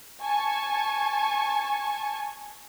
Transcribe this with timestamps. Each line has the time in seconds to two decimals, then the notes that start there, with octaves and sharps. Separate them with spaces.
0.22 G#5 A5 C#6 G#6